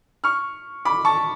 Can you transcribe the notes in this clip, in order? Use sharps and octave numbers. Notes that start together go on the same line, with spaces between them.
C#6 F6
B5 D6
A5 C#6